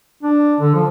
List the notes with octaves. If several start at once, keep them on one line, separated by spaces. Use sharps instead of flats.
D4
D3
F3